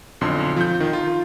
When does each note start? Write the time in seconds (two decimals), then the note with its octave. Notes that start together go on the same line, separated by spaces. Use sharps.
0.21 B1 F2 D3 C6
0.56 F3 G6
0.80 D#3
0.93 F4